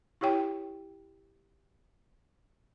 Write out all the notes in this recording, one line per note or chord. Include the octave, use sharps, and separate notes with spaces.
E4 G4 C#5 G5